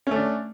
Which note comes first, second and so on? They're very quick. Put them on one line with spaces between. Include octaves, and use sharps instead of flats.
C#4 A3 D4